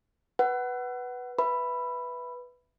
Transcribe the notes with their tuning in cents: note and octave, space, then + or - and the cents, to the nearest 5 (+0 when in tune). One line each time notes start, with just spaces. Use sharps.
B4 +0 F#5 +20
B4 +0 E5 +0 B5 +0